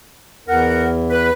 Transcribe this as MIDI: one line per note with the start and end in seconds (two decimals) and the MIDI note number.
0.48 1.30 40
0.48 0.88 70
0.48 0.88 78
1.10 1.32 71